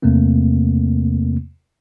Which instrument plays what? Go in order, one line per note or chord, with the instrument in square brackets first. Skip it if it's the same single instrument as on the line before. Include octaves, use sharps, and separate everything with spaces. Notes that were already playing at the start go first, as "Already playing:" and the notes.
[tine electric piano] E2 C3 A3 A#3 C4